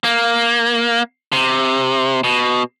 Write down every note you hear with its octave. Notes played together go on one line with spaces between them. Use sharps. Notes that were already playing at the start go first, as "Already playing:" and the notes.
A#3
C3
B2